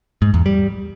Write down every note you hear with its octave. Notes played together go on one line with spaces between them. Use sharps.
G#2
E2
G3